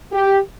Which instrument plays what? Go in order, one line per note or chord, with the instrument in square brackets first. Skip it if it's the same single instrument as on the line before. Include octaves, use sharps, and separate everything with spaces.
[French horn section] G4